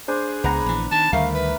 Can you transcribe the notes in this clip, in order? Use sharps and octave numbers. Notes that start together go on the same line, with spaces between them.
D4 G#4 C5
C#2 B3 F#5 A#5
A#1 E3
D#3 A5
D2 D#3 G3 A3 A#4 F5
B4